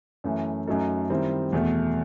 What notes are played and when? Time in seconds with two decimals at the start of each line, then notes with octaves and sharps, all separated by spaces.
0.24 F#2 E3 A3
0.67 F#2 F#3 A3 D#4 A4
1.10 D#3 G3 C4 E4
1.52 E2 B2 A3